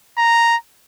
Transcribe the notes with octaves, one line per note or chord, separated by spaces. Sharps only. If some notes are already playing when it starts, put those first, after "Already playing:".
A#5